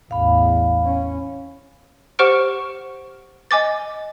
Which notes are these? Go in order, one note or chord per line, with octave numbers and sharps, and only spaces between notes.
A1 E2 F5 B5
C#4
G4 C5 F#5 C#6 F6 D7
D#5 G#5 D6 A6